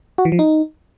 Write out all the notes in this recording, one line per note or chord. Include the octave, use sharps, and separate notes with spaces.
F#4
E3
F3
D#4